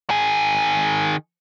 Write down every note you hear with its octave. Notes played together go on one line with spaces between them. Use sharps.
D#3 G#4